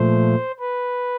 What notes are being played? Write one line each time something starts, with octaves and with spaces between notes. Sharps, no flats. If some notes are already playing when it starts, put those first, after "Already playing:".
Already playing: A#2 F3 A3 C5
B4